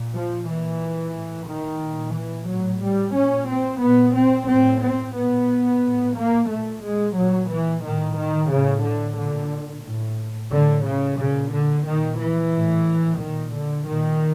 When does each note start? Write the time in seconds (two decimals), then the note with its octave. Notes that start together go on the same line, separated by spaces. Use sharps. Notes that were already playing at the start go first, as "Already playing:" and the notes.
Already playing: A#2
0.14 F3
0.47 A#2 E3
1.15 A2
1.48 D#3
1.82 A#2
2.15 E3
2.48 A2 F#3
2.83 G3
3.15 A#2 C#4
3.50 C4
3.82 A#2 B3
4.16 C4
4.49 A2 C4
4.82 C4
5.16 A#2 B3
5.83 A2
6.16 A#3
6.50 A#2 A3
6.84 G#3
7.16 A#2 F#3
7.50 E3
7.83 A2 D#3
8.17 D#3
8.50 A2 C#3
8.84 D3
9.18 A#2 D3
9.85 A2
10.51 A2 D3
10.86 C#3
11.18 A#2 C#3
11.52 D3
11.86 A#2 D#3
12.19 E3
12.53 A2
13.19 A#2 D#3
13.53 D3
13.86 A#2 D#3